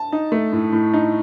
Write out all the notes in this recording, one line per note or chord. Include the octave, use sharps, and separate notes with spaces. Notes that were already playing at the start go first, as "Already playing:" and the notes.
Already playing: A5
D#4
A3
A2
A2
D#4